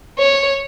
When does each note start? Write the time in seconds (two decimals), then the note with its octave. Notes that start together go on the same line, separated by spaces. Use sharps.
0.19 C#5